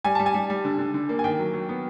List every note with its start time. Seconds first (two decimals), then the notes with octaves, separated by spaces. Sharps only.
0.04 G3 G#5
0.15 G3 A5
0.26 G#5
0.34 G3
0.50 G3
0.65 D3
0.79 D3
0.94 D3
1.09 A#3
1.19 G#5
1.24 D#3 G5
1.39 F#3
1.54 F#3
1.69 B3